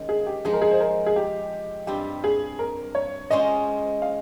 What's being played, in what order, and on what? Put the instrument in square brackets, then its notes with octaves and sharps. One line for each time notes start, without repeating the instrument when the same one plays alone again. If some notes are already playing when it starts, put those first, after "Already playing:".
Already playing: [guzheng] D#3 G#3 C#4
[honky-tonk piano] G#4
G4
[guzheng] F3 G#3 D#4 [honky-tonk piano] G#4
[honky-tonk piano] A#4
G#4
C5
A#4
G#4
G4
[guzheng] G2 G3 C4 F4 [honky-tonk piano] G4
[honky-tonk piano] G#4
A#4
C#5
[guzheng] G#3 C#4 F4 C5 [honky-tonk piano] D#5
[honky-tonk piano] F5